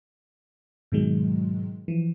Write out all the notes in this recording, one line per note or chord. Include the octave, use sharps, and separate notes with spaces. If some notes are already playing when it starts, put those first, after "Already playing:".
G#2 B2 D#3 F#3 G#3
E3 F3